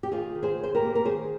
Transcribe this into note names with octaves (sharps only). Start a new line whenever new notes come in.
G4
D#3 F4 G#4
D#3
G#4 C5
D#3 C5
G4 A#4
A#3
A#4
D#3 G#4 C5